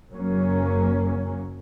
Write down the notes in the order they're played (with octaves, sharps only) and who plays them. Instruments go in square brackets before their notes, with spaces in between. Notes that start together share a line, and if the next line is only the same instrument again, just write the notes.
[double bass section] F#1 F#3 A#3 C#4